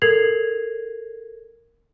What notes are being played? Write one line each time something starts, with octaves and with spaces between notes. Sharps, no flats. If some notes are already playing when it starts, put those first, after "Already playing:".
A4 A#4 G#6 C7 F7 F#7